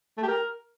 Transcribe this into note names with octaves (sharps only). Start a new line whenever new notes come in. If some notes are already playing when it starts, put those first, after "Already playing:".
A3
G4
A#4